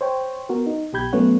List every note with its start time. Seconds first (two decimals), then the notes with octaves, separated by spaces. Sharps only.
0.01 C5 C#5 G5
0.49 B3 F#4 A#4
0.66 D#4
0.93 B1 B2 G4 B5 G6 G#6
1.13 F#3 A3 B3 C#4 C#5 F#5